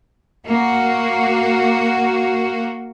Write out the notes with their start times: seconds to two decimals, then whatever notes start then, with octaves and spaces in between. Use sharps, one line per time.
0.48 A#3 F#4